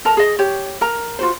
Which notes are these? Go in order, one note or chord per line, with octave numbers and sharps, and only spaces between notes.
A4 A#4 A5 A#5
G#4 D#5
G4 C#5
A#4 A#5
F4 F#4 C5